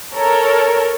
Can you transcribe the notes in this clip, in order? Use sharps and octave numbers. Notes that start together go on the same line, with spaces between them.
A4 A#4 C#5